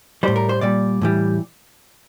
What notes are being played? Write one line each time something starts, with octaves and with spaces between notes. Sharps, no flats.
A2 G3 C5
A#4
C5
A#2 G3 D5
A2 E3 G3